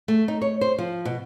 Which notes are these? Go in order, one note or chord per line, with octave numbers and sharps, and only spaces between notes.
A3
D#4
C#5
C5
F3
B2